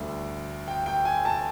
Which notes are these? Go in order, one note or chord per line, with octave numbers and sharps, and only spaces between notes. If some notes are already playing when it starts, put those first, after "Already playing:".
Already playing: D2 D3 G3
G5
G5
G#5
A5